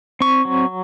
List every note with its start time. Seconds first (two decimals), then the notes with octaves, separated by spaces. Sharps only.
0.21 C4 C#6
0.45 F#3